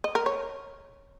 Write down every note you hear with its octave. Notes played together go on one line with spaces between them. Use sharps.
D#5
A#4
C#5